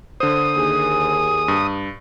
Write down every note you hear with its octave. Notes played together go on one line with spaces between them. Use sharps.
D3 C5 D#6
D#2 G#4
G2